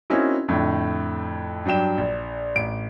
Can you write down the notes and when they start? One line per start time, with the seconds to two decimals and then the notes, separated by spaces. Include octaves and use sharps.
0.10 A#3 C4 C#4 D#4 E4 F#4
0.48 F2 A2 D3
1.65 G2 F#3 D4 G5 E7
1.98 A#1
2.55 A1 D7